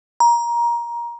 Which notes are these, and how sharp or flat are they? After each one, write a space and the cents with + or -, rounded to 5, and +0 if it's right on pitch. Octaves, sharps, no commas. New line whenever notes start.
A#5 +20